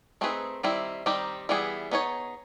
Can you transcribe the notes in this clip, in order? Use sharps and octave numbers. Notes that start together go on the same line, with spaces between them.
A3 C4 D#4 G#4 B4
D#3 G3 C4 E4
D#3 G3 C4 D#4 G4
E3 G3 B3 E4 G#4
B3 D#4 G#4 C#5